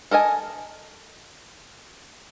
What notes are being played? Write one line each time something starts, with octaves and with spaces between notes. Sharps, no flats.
A4 A#4 D#5 G#5